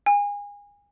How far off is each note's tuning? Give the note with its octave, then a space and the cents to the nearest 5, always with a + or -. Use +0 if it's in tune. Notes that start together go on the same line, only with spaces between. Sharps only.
G#5 -30